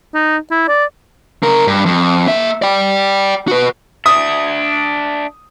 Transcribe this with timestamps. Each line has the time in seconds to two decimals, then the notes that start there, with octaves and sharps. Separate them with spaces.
0.14 D#4
0.51 E4
0.68 D5
1.43 C#3 A#4
1.67 G2
1.86 F2
2.27 A#3 E5
2.62 D5 G5
3.48 F#4 B4
4.06 D4 E5 D#6